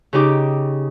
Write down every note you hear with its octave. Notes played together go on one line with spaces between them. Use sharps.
C#3 D#4 G4 D6